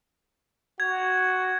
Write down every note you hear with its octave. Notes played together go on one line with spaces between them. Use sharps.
F#4 G#6